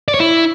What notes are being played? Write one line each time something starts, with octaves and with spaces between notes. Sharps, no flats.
D5
C#5
E4